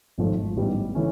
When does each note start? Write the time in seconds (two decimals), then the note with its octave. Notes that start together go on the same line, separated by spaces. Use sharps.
0.18 G#1 G#2 F3 A3
0.56 A1 G#2 E3 G3 B3
0.95 C#3 E3 A3 C#4